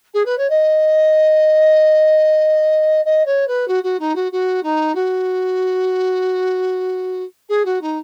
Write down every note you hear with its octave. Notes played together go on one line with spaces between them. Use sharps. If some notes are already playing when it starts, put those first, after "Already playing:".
G#4
B4
C#5
D#5
D#5
C#5
B4
F#4
F#4
D#4
F#4
F#4
D#4
F#4
G#4
F#4
D#4